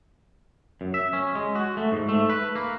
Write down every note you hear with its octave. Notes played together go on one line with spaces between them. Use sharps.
F#2
E5
C#4
G#3
F#4
A3
G#2
A3
B4
A#3